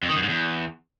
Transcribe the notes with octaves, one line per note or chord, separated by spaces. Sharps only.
F2
D#3
F#2
G#2
E2